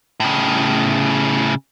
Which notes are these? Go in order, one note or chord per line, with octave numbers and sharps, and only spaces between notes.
A2 C#3